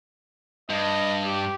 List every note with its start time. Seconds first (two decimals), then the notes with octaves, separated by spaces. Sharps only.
0.70 G2 D#5
1.24 G4